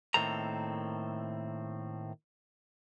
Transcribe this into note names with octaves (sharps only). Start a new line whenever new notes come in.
A2 D#3 A#3 C4 A4 A#5